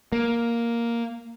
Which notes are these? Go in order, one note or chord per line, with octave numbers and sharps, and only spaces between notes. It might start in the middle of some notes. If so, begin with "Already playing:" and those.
A#3